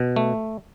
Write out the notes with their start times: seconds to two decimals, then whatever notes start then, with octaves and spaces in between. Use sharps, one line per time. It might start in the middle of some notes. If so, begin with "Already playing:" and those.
Already playing: B2
0.16 A3